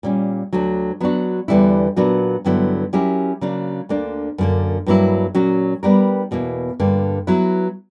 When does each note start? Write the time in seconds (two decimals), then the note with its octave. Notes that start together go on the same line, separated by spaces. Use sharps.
0.03 A#2 G3 C#4
0.53 D2 D3 F#3
1.00 F#3 B3 D4 F#4
1.48 E2 D3 G3 B3 E4
1.96 A#2 F#3 B3 D4 F#4
2.45 G2 D3 F#3 B3 E4
2.93 F#3 C#4 E4 G4 A#4
3.41 C#3 F#3 A#3 D4
3.89 D2 D3 A#3 D4
4.38 F#2 D3 A#3
4.86 G2 F#3 A#3 E4
5.35 A#2 F#3 C#4 F#4
5.83 G3 B3 D4 G4 A#4
6.31 E2 B2 A#3 E4
6.79 G2 D3 A#3
7.27 F#3 B3 E4